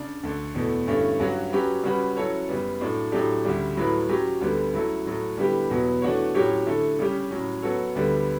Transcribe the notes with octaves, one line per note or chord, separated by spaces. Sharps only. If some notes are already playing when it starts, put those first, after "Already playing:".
Already playing: C#3 D4
D2 D3 A3
E2 B2 A3
G2 D3 A3 C#4 E4
G2 F#3 C#4 F#4
F#3 C#4 G4 B4
C#3 G3 C#4 F#4 B4
F#3 C#4 E4 A4 C#5
F#2 C#3 G3 B3
A2 F#3 A3 D4
A2 F#3 A3 D4 G4
D2 C#3 G3
A2 F#3 A3 E4 B4
F#3 C#4 G4
D2 D3 G3 B3
C#3 F#3 A3 E4 A4
A2 F#3 A3
D3 G3 B3 E4 G4
E2 B2 F#3 B3
E3 A3 D4 F#4 C#5
A2 F#3 C#4 G4 C#5
D3 A3 E4 A4
C#3 G3 C#4 G4
A2 F#3 C#4
F#3 B3 F#4 A4 C#5
D2 D3 G3 B3